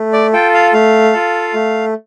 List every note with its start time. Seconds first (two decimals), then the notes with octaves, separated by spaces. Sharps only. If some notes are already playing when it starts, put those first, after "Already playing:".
Already playing: A3
0.13 D5
0.33 F4 A4 G5
0.54 F5
0.73 A3 F5
1.13 F4 A4
1.54 A3